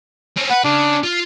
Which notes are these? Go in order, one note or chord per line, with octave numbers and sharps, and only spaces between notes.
C4 C#4
B4 F#5
C#3 D4
F4